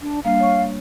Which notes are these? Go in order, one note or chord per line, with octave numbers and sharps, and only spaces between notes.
D4
G3 A#3 D4 F5
C#5 C#6